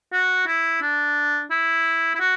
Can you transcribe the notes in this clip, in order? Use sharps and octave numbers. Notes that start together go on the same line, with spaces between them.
F#4
E4
D4
E4
E4
F#4